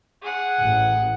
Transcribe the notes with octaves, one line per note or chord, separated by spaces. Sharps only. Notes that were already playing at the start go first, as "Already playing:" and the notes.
G#4 F#5
A1